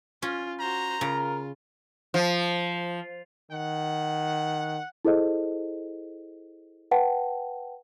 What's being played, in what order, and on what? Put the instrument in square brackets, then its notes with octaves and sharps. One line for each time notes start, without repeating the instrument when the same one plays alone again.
[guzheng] C#4 [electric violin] F4
[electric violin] F#4 C5 [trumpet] A#5
[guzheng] C#3 [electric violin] F4 [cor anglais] A#4
[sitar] F3
[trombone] D#3 [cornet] F#5
[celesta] E4 G#4 A4 C5 D#5
B4 F#5 G5 A5